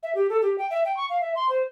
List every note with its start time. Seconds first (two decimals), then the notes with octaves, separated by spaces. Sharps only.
0.03 E5
0.15 G4
0.29 A4
0.42 G4
0.58 G5
0.71 E5
0.85 G5
0.97 C#6
1.10 F5
1.21 E5
1.36 C6
1.49 C5